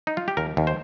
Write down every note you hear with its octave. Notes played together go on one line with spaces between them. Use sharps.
D#4
F4
G4
D#2 A#4
D#2
C5